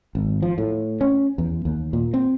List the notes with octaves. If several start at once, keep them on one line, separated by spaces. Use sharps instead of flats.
G#1
F3
A2
C#4
E2
D#2
A#2
C4